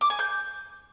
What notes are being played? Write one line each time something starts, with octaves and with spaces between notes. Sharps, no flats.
D6
G#5
G6